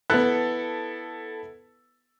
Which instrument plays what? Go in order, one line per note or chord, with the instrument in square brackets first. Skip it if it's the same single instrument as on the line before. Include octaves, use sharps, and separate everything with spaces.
[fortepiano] B3 F#6 [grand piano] E4 A4